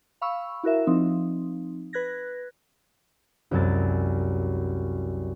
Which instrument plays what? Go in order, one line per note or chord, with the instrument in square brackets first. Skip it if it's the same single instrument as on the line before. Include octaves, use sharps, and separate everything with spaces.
[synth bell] F5 B5 C#6 E6
E4 F#4 A#4 E5
F3 C4 D#4
B4 F#6 G#6 A#6
[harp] C2 F#2 F#3 G#3 A6